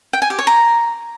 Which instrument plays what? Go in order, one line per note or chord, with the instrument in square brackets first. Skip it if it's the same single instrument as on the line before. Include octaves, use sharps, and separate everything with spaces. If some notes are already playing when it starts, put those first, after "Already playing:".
[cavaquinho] G5
G#5
G4
C#5
A#5